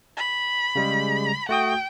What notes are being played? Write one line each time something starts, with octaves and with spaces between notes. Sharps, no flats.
B5
C#3 G3 G#3
A3 F#4 G5 D#6